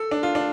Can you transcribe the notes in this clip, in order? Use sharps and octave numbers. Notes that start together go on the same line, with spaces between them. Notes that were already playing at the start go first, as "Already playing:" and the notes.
Already playing: A4
D4
F4
D4